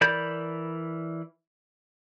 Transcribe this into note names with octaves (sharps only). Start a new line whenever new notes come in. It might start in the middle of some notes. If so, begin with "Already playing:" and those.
E3 A#4 D5 B5 G6